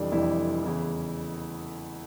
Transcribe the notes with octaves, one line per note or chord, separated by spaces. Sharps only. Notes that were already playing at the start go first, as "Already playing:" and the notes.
Already playing: F1 F2 E3 G3 D4
F1 F2 E3 G3 E4
E2 C#3 E3